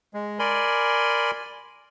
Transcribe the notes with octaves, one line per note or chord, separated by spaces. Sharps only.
G#3
A#4 D5 G#5 B5 C6